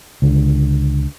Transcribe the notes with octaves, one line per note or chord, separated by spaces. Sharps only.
C#2 D3